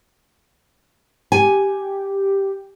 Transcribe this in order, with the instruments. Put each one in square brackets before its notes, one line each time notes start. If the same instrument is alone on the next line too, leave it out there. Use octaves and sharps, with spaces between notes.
[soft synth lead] G4 [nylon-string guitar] G#5